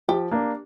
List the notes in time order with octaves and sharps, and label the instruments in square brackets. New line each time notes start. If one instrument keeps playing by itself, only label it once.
[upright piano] F3 [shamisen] G4
[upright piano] A#3 D4